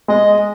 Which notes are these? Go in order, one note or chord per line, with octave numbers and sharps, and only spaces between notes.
G#3 D#5